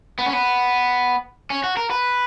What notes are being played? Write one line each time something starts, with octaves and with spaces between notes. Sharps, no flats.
B3
C#4
B3
C#4
F#4
A#4
B4